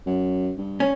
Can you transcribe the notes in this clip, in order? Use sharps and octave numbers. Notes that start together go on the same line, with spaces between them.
F#2
G2
C#4